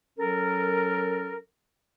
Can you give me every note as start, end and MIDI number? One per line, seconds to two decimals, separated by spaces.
0.18 1.38 54
0.18 1.38 61
0.18 1.38 69
0.18 1.38 70